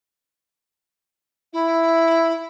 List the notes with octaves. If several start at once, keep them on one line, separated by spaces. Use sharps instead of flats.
E4